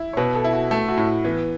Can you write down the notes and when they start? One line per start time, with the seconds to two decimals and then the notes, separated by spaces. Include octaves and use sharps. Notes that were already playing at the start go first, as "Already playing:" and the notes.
Already playing: E4
0.13 C#5
0.17 B2 B4
0.35 A4
0.44 E4
0.53 F#4
0.71 A3 A4
0.89 F#4
0.97 A2
1.07 E4
1.25 E3 B3